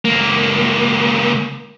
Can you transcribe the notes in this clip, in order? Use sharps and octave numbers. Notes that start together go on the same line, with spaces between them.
C#2 A#3